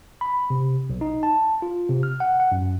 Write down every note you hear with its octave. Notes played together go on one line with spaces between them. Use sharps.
B5
C3
B1
D#4
A5
F4
C3
F6
F#5
F#5
F#2